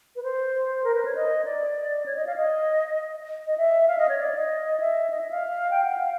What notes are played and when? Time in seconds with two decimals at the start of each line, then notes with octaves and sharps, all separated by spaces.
0.16 B4
0.23 C5
0.84 A#4
0.95 B4
1.05 C#5
1.15 D#5
1.45 D5
2.06 C#5
2.16 D#5
2.27 F5
2.36 D#5
3.47 D#5
3.58 E5
3.88 F5
3.98 D#5
4.09 C#5
4.18 D5
4.35 D#5
4.80 E5
5.10 D#5
5.21 E5
5.31 F5
5.71 G5
5.84 F#5
5.98 F5